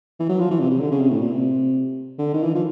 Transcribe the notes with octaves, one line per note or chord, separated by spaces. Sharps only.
E3
F#3
F3
E3
C3
C3
D3
C#3
C3
A2
A#2
C3
D3
D#3
E3
F3